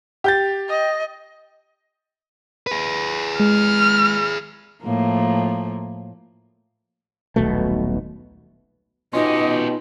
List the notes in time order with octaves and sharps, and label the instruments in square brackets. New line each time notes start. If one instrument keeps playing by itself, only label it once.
[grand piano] G4 G6 A6
[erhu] D#5
[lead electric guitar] G#4 B4
[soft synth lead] G#3 [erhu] F6
[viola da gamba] A2 F3 A#3
[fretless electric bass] D#1 B1 B2 A3
[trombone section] B2 [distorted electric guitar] C#4 G4 [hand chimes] D#4 F4 C6 [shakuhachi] D#5